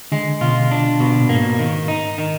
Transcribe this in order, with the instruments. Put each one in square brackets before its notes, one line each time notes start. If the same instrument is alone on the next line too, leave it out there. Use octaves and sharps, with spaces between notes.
[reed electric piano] D3 [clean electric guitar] G#3
[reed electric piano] B2 [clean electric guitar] F4
[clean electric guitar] D4
B2
[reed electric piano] A#2
[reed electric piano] G#2 [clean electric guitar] A#3
[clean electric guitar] D#3
D#4
D#3